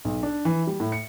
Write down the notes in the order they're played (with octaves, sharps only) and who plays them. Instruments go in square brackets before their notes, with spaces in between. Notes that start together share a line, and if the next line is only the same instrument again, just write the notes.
[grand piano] B1
D4
E3
G3
A2
C#7